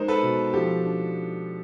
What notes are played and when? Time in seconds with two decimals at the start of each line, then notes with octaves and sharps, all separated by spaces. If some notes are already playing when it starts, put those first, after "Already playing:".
Already playing: G#3 D#4 A#4 C5
0.08 A4 B4
0.23 B2
0.53 F3 G4 A4
0.84 D4